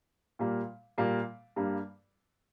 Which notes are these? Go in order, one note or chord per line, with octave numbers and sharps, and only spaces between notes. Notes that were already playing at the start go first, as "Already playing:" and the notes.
A#2 G3 A#3
A#2 G3 A#3
G2 G3 A#3